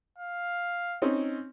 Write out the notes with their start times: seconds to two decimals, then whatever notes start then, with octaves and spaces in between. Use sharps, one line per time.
0.19 F5
1.02 C4 C#4 D#4